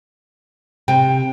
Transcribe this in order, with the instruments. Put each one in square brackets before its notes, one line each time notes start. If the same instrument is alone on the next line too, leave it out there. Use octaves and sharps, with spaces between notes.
[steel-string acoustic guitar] C3 [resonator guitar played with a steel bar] G5